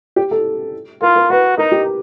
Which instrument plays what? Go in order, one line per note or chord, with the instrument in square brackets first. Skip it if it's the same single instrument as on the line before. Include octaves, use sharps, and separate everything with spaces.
[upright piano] G4
A4
[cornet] F4 [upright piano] A#4
[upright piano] A#4
[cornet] F#4 [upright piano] B4
[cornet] D#4 [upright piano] A#4
[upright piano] G4